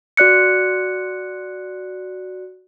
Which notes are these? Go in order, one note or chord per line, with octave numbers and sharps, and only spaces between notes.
F#4 D5 F#6 C#7